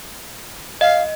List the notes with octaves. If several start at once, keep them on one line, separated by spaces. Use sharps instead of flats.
D#5 F5